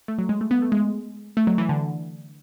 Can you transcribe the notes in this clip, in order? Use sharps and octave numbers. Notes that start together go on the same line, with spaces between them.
A3
F#3
G#3
A3
B3
A3
G#3
A3
F#3
E3
D3